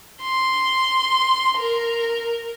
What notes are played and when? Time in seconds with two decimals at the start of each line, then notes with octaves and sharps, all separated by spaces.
0.22 C6
1.57 A#4